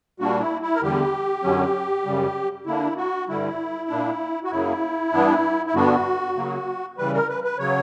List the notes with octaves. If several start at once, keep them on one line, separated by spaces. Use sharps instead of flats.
A#2 G3 A#3 D4 F#4
E4
E4
A#4
E2 D3 G3 G4
F#2 D3 F#3 C#4
F#2 C#3 G3
D3 A#3 D4 E4
F#4
G2 D3 G3 E4
A#2 A#3 D4
F#4
F#2 C#3 F#3 A#3 E4
G2 E3 B3 D4
E4
G2 D3 G3 B3 D4 F#4
C#3 F#3 A#3
C#3 E3 G3 B4
A#4
B4
B4
C#3 F#3 C#5